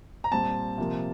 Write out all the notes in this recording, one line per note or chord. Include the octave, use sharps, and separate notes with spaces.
A#5
A#2 G3 C4 A5
C3 F3 A#3